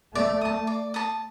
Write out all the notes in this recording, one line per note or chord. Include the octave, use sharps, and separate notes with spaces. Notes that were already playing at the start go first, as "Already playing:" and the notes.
A3 D5
A5 D#6
D5
A5 D#6